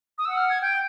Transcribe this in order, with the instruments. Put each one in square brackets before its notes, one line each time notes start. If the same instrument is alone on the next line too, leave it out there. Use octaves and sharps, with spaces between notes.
[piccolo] D#6
[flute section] F#5 [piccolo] E6
[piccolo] F6
G#6
[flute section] G5 [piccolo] G6